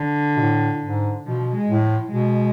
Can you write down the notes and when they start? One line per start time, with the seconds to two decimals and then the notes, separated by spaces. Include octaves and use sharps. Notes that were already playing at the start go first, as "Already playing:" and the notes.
Already playing: D3
0.37 B2
0.41 A2
0.83 G#2
1.26 B2 F3
1.55 G#3
1.68 A2
1.83 F3
2.11 B2 G#3